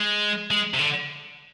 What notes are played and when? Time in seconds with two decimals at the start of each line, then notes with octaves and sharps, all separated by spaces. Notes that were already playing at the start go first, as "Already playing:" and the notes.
Already playing: G#3
0.51 G#3
0.74 C3
0.79 D3